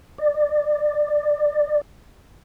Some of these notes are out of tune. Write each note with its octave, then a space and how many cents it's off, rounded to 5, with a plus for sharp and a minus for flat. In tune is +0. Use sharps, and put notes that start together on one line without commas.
D5 +20